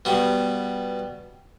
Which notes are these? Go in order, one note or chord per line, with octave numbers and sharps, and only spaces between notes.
B2 G3